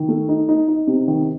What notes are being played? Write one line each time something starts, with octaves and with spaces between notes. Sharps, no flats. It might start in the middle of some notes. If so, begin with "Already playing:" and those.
Already playing: D#3
A3
D#4
D#4
D#4
C3
D#3